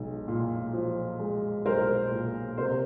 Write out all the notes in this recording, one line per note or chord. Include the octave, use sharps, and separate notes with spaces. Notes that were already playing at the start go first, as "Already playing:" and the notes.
Already playing: B1 G#3
A#2
F3
G#3
B1 A#4 C5
A#2
C3 A#4 C5